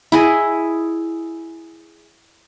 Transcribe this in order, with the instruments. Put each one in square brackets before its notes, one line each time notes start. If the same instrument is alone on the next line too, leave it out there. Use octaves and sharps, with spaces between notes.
[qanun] E4 G#4 D#5